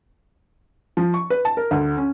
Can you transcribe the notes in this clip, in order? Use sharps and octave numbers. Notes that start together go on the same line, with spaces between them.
F3
C#6
B4
A5
A#4
D2
C#4